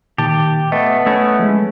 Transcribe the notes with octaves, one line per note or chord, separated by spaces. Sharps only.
A#2 D#3 G4 A5
A3 B3 D#5
A3 C#4 E4
F3 G#3